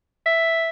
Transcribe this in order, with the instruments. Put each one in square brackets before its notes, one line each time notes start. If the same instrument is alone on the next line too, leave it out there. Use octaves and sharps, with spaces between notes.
[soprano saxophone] E5